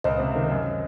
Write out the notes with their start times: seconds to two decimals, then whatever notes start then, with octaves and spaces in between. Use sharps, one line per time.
0.04 C#2 C5 D#5
0.19 C3
0.35 D#3
0.50 F#2